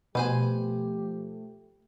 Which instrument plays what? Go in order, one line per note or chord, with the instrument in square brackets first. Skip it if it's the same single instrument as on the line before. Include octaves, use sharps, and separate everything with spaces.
[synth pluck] B2 [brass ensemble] F3 G4 [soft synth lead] A3 [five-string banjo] B4 C5 G#5